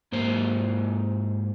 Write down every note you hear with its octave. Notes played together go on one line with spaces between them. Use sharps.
G#2 A#3 C5